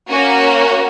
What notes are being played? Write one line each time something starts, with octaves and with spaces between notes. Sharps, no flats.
A#3 C#4 F#4